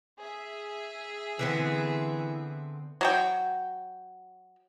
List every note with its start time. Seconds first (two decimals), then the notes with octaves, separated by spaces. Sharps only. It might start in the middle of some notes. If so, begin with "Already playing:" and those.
0.20 G#4 E5
1.39 D3 E3 B3 C4
3.01 F#3 F#4 G5